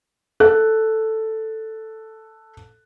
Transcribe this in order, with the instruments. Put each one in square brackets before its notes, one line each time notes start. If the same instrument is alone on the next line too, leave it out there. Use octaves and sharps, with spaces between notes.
[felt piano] A4 F#6